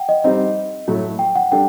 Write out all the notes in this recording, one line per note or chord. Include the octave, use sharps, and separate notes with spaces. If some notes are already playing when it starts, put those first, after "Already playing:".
Already playing: F#5 G5
D#5
G3 C4 D#4 D#5
A2 F#3 A3
G5
F#5
G3 D4 A4 G5